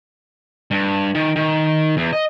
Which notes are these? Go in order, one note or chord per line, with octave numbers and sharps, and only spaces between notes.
G2
D#3
D#3
E2
D#5